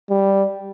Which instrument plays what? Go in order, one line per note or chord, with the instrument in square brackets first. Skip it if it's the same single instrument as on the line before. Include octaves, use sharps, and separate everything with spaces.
[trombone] G3